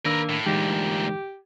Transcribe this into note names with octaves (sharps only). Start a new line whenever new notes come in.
D#3 A#3 D4 A#4 B4 E6
A2
D2 A#2 E3 G#3 D#4 G4